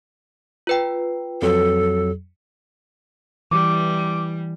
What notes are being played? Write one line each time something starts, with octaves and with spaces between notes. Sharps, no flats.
F4 B4 G5
F2 F#3 A4
E3 G3 D6